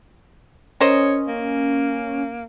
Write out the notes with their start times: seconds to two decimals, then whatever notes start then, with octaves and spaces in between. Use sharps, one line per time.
0.81 C#4 A#4 C5 C#5 D#5
1.27 A#3